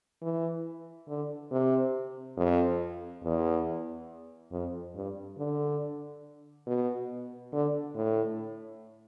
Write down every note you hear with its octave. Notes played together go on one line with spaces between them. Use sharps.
E3
D3
C3
F2
E2
F2
G2
D3
B2
D3
A2